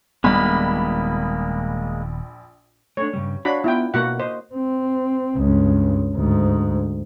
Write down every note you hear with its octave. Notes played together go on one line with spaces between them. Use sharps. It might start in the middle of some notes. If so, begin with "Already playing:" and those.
D#1 A#1 G3 G#3 A#3 B3 B5
A3 C4 D4 C#5
G2 C#3 G3
D4 F#4 C#5 F5 B5
B3 E4 F4 G5 A#5
B2 A#3 F#4 F#5
C5 D#5
C4
C#2 G2
D2 G#2